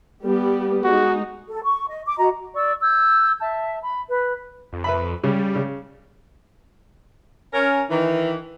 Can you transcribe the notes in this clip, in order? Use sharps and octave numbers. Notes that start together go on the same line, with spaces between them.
G3 B3 G4
G#3 D#4 F#4
A4
C#6
D#5
D6
F#4 D#5 A#5
D5 C#6 E6
E6 G6 G#6
E5 A5
B5
B4
F2
B4 E5 B5
C#3 G3
C#3
C#4 A#4
D#3 E3